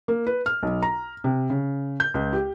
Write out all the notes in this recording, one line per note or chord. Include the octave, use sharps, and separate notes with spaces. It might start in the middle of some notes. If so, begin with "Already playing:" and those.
A#3
B4
F6
B1
A#5
C3
C#3
G6
C#2
G4